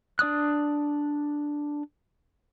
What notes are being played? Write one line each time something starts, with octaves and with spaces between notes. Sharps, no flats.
D4 D5 D#6 F#6